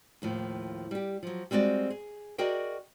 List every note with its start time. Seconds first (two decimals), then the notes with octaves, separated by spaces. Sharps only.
0.22 D#2 A2 F3
0.91 G3 G4
1.23 F3 F#3
1.51 G3 G#3 C4 F#4 D5
1.90 G#4
2.38 F#4 G#4 A#4 D5 D#5 G5